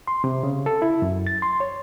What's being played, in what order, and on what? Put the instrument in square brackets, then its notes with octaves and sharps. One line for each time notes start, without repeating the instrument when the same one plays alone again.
[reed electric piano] C6
C3
C#3
A4
E4
F#2
A6
C6
C#5